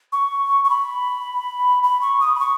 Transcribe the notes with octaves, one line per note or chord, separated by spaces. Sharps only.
C#6
C#6
B5
B5
C#6
D#6
B5
C#6